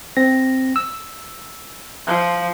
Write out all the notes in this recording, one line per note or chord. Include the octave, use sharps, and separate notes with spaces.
C4 A#6
E6
F3